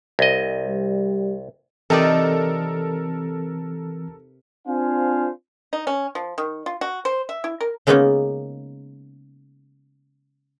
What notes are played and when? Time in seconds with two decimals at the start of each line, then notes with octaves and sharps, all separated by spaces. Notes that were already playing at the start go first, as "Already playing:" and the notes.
0.19 C2 D#5
0.68 G3
1.90 C3 E3 C4 D#4 A4 A#4 D5
4.68 C4 D4 F4 C5 F5 G#5
5.73 D#4
5.87 C#4
6.15 F3
6.38 D#3
6.66 F4
6.81 F#4
7.05 C5
7.29 E5
7.44 E4
7.61 A#4
7.87 C#3 G#3 A#3 B3 C#4 D#4